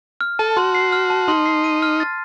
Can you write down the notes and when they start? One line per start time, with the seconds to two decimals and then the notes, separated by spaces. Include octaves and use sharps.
0.21 F6
0.39 A4 A5
0.57 F#4 C6
0.75 C7
0.92 F6
1.10 A5
1.28 D#4 C6
1.46 C7
1.64 D#7
1.82 F6
2.00 A6